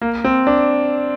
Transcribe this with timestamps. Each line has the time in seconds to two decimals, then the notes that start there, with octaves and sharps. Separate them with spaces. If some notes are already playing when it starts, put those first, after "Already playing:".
0.02 A#3
0.24 C4
0.47 D4